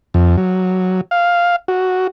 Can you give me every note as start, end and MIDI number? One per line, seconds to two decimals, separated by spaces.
0.14 0.36 41
0.37 1.01 54
1.11 1.56 77
1.68 2.07 66